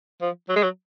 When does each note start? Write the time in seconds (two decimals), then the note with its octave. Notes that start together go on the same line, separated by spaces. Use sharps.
0.21 F3
0.49 F#3
0.56 G#3
0.63 F#3